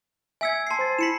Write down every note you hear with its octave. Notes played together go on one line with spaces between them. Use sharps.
E5 G#5 E6 G#6 B6 C#7
A5 C6 G#6 C7 C#7
C5 C6 A6
E4 B5 B6 C#7 E7 F#7